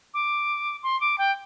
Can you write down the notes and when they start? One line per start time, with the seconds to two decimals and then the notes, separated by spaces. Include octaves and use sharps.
0.14 D6
0.83 C6
1.00 D6
1.18 G5